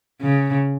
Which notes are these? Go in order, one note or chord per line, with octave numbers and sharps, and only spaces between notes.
C#3